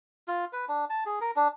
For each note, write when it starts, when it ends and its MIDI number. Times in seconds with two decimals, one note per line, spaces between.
0.28 0.45 65
0.53 0.65 71
0.68 0.85 62
0.90 1.04 81
1.06 1.19 68
1.21 1.31 70
1.36 1.48 62